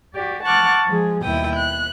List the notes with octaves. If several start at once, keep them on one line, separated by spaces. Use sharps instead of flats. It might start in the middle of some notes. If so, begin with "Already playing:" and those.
F#4 G4 D5
F#5 A5 C#6 D6 F6 F#6
F3 G#3 G#4
D#2 B2 G3 E4 G5 D#6
F#6